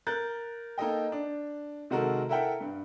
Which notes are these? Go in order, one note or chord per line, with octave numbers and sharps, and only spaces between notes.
A#4 F#6 G6 A6
A#3 D#4 A4 D#5 G5
D4
C3 D#3 G#3 F#4 A4 A#4
E4 A4 A#4 E5 F#5 G5
G2